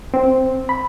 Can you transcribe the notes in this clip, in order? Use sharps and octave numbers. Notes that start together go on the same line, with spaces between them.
C4
B5